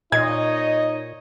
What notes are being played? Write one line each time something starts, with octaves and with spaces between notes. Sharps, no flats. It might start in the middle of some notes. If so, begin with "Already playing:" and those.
A#2 D#4 C#5 D#5 G#6